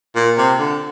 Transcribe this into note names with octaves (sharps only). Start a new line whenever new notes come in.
A#2
C3
D3